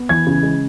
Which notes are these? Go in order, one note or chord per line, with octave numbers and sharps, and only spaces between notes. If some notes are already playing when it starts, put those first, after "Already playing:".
Already playing: B3
E3 G#6
C#3
G#3